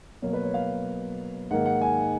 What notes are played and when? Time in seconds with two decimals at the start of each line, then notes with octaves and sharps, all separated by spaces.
0.22 B2 F#3 A#3 C#5
0.33 B4
0.44 C#5
0.54 F5
1.50 G#2 D#3 A#3 F#5
1.66 F#5
1.81 G#5